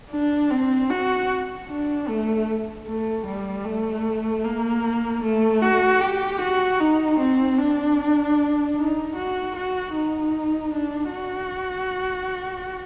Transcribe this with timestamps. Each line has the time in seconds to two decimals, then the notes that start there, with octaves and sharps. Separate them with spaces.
0.11 D4
0.51 C4
0.90 F#4
1.69 D4
2.08 A3
2.87 A3
3.26 G3
3.65 A3
4.45 A#3
5.23 A3
5.62 F#4
6.01 G4
6.41 F#4
6.80 D#4
7.19 C4
7.58 D4
8.77 D#4
9.16 F#4
9.56 F#4
9.94 D#4
10.74 D4
11.12 F#4